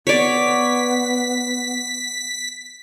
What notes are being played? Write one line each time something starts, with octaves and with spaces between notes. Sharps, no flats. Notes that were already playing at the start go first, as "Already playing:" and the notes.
B3 C#5 D5 B6